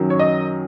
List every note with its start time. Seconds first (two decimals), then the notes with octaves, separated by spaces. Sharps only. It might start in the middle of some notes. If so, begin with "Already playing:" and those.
Already playing: F#2 D#3 F#3
0.10 C#5
0.19 D#5